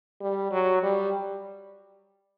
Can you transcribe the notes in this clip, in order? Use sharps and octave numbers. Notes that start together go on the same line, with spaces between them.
G3
F#3
G3